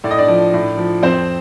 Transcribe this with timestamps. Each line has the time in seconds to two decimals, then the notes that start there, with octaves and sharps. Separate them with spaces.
0.04 A2 D5
0.11 D#5
0.18 D4 D5
0.28 F3
0.54 A2
0.77 F3
1.02 F2 C4 C5